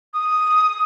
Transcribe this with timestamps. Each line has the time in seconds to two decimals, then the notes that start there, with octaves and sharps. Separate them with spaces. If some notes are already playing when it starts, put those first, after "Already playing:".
0.14 D#6